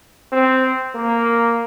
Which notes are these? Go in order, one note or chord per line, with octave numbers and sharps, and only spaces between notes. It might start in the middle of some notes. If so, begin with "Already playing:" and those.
C4
A#3